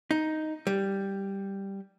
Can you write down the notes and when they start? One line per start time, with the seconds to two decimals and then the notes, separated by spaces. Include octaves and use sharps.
0.11 D#4
0.67 G3